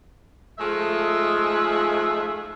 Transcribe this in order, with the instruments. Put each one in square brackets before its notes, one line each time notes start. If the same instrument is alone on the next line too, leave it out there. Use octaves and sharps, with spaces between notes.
[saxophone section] F3 G#3 A3 D#4 F4 E5